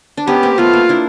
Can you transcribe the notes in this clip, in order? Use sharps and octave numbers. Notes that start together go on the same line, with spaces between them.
D4
B3 C#4 G4
A#3 C4
A3 B3 F4
A#3
D4 E4